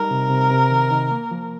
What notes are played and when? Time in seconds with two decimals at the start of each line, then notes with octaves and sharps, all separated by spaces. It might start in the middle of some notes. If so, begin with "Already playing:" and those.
Already playing: G3 D#4 A#4
0.11 C3
0.30 C3
0.50 C3
0.71 D#3
0.91 D#3
1.11 A#3
1.31 F3